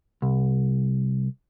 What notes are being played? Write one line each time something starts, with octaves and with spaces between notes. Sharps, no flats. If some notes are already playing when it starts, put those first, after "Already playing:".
C2